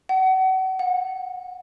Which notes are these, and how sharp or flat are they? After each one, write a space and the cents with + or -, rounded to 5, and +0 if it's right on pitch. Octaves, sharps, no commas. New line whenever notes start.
F#5 +35
F#5 -30